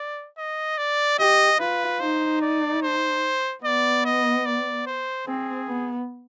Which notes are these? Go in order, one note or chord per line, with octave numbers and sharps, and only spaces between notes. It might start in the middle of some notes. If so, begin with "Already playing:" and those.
Already playing: D5
D#5
D5
G4 D#5
F4 B4
D#4 C5
D5
C5
B3 D5
D#5
D5
C5
C4 G#4
B3